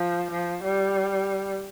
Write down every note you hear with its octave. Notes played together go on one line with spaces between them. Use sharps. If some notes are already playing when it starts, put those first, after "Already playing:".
Already playing: F3
F3
G3